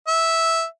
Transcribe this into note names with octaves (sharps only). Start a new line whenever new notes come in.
E5